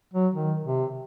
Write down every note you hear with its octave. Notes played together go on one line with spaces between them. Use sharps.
F#3
D#3
C3